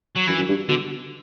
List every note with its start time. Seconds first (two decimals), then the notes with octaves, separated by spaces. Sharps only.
0.16 F#3
0.27 F#2 E3
0.38 F#2
0.48 G2
0.69 B2 D3